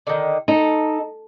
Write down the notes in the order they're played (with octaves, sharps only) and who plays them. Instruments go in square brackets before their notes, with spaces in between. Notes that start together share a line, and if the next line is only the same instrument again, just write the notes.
[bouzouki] D3 D#3
[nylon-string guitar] D#4 [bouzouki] A4